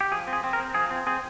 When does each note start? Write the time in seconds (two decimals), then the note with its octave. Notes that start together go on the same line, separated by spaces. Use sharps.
0.01 G4
0.11 F3 G#4
0.27 C4
0.33 G#4
0.44 C4
0.53 A#4
0.60 C4
0.74 F3 G#4
0.90 C4
1.07 C4 G#4